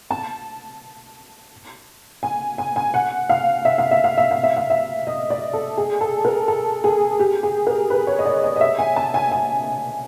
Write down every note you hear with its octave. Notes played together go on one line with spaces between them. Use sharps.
A5
G#5
G#5
G#5
F#5
F5
E5
F5
E5
F5
E5
F5
E5
F5
E5
D#5
D5
A4
G#4
A4
A#4
A4
G#4
G4
G#4
A#4
B4
C#5
D#5
D5
D#5
D#5
E5
G#5
A5
G#5
G#5